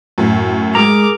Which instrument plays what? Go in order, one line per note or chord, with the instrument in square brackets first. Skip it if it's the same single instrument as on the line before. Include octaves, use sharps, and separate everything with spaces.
[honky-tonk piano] F#2 A2
[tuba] G#3 [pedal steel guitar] G#4 A#4 A#5 [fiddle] D6